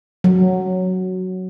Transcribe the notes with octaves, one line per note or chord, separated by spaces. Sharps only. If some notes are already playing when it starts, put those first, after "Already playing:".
F#3